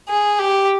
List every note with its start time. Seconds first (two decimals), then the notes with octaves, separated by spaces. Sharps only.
0.08 G#4
0.39 G4